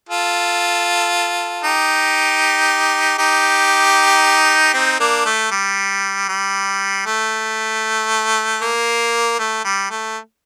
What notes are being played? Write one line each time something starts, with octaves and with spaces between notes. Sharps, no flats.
F4 A4
D#4 G4
D#4 G4
C4 D#4
A#3 D4
A3
G3
G3
A3
A#3
A3
G3
A3